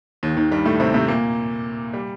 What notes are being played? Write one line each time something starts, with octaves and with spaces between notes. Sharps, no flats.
D#2 D#3
D#2 D#3
G2 G3
A2 A3
C3 C4
C3 C4
A#2 A#3
G3